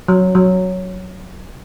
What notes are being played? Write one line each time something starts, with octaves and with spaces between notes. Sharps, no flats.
F#3
F#3